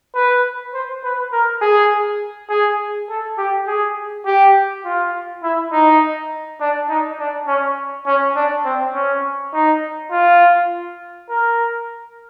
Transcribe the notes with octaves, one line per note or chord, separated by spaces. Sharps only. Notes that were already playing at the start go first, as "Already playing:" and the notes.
B4
C5
B4
A#4
G#4
G#4
A4
G4
G#4
G4
F4
E4
D#4
D4
D#4
D4
C#4
C#4
D4
C4
C#4
D#4
F4
A#4